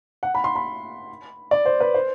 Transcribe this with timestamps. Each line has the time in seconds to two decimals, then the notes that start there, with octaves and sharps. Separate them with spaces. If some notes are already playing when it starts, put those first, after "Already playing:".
0.23 F#5
0.35 B5
0.44 C6
0.56 B5
1.51 D5
1.66 C5
1.80 B4
1.94 C5